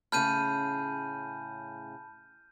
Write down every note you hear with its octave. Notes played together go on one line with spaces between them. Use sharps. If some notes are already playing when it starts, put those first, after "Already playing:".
A2 C#3 G#4 A5 B5 F6 G6 D#7